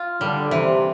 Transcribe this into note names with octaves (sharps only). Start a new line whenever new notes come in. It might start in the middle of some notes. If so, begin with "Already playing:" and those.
Already playing: F4
D3 G3
C3 E3